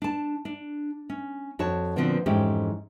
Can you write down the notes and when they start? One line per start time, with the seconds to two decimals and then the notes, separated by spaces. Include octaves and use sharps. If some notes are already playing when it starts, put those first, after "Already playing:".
0.02 D4 A5
0.45 D4
1.10 C#4
1.59 F2 F#4 C#5 A5
1.96 A#2 D3 F3 B3 C4 F#4
2.26 F2 G#2 E3 C#4 G4